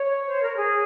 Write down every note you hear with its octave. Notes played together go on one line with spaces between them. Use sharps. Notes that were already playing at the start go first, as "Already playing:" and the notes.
Already playing: C#5
C5
A#4
G#4